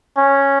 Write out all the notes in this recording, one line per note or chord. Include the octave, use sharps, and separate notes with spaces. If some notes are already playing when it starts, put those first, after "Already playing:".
C#4